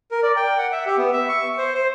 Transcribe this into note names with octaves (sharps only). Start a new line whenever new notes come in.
A#4
D5
G5
F#5
E5
G4
B3
E5
C#6
C5
C5